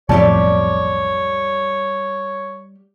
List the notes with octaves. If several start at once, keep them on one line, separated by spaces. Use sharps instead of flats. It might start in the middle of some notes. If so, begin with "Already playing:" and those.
B1 F2 A2 G3 G4 C#5 E5 A5